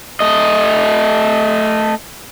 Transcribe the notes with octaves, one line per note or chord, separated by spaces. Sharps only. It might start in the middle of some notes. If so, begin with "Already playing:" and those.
A3 D#5